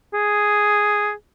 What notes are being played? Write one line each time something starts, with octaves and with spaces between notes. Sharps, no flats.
G#4